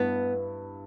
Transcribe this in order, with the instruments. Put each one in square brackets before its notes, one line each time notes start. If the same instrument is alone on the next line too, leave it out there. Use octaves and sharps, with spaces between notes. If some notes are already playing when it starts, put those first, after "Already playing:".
Already playing: [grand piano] G2 E4 [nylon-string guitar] B3